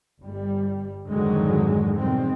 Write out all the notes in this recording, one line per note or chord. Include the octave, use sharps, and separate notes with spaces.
G1 G3
F2 G#2 D3 D#3 F#3 G#3
B2 D#3 G3 G#3 C4